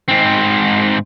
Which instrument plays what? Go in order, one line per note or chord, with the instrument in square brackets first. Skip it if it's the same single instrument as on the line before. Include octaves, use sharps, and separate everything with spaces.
[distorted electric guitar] G#2 C4